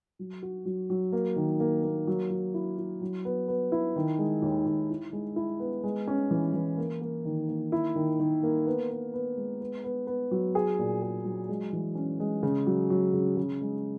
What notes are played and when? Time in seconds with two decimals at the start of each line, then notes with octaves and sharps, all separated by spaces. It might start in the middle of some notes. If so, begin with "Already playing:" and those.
0.19 F#3
0.42 F#4
0.65 F#3
0.90 F#3
1.12 A#3
1.36 D#3
1.60 A#3
1.84 A#3
2.07 F#3
2.30 F#3
2.54 E4
2.78 E4
3.01 F#3
3.25 B3
3.48 B3
3.72 E4
3.96 D#3
4.18 G#3
4.42 D#2
4.66 D#2
4.90 E4
5.13 G#3
5.36 E4
5.60 B3
5.84 G#3
6.08 C#4
6.31 E3
6.54 E3
6.78 A#3
7.01 A#3
7.25 D#3
7.49 A#3
7.72 E4
7.96 D#3
8.20 D#3
8.43 A#3
8.66 B3
8.90 B3
9.14 B3
9.37 G#3
9.61 B3
9.84 B3
10.07 B3
10.31 F#3
10.55 G#4
10.79 A#2
11.02 G#4
11.25 F#3
11.49 G#3
11.73 E3
11.95 C#4
12.20 G#3
12.43 C#3
12.66 F#3
12.90 F#3
13.13 C#3
13.37 C#3
13.61 G#3